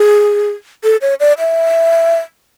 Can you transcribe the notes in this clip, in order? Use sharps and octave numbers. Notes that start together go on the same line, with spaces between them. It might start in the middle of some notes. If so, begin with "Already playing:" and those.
Already playing: G#4
A4
C#5
D5
E5